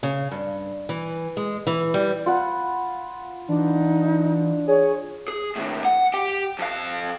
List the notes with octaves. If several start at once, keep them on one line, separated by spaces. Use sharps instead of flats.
C#3
G2
E3
G#3
E3
G3
F4 F#5 B5
E3 D4 D#4
G#4 C#5
G#4
D#2 A2
F#5
G4 G5
F2 F5